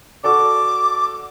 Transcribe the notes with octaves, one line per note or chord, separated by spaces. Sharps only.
F#4 A4 D5 D6